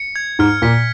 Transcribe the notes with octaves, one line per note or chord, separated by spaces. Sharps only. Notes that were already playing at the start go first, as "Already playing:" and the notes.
Already playing: C#7
G#6
G#2 F6
A#2 B6